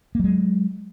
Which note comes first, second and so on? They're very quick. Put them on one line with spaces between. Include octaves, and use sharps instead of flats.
A#3 F#3 G#3